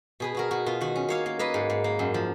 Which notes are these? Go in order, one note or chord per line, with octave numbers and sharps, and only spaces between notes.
B2 G#4 B4
B2 F#4 A#4
B2 F#4
B2 F4
D#3 F#4
C#4
A#3 C#5 F5
A#3
A#3 B4 D#5
G#2
G#2
A#3
F#2
F3